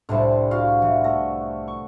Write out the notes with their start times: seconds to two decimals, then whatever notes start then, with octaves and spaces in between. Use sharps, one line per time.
0.09 C2 A2 D3 G3 C5
0.51 F#4 F5
0.82 E3 F#5
1.04 A3 A#6
1.68 C#6